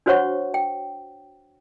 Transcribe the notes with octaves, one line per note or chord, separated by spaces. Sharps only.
D4 F#4 C5 C#5 F#5 C#6
G5